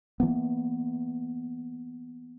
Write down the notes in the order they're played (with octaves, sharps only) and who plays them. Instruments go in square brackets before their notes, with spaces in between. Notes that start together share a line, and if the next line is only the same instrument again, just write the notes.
[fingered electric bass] E3 A#3 B3